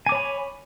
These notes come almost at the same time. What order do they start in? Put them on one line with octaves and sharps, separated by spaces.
G#5 D6 C#5 B5